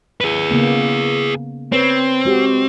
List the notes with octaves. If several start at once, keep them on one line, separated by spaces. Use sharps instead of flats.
G#4 B4
C#3 A#3 B3
C4 B4 C#5
G#3 F#4 G4